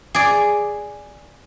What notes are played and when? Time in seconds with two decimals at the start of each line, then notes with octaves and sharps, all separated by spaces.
0.15 G#4 D5